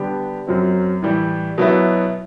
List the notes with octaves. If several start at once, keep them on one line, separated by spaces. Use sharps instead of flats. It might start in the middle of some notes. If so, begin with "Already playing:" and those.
Already playing: D3 G3 B3 D4 G4
F#2 F#3 C4
A2 E3 G3
B2 F#3 B3 E4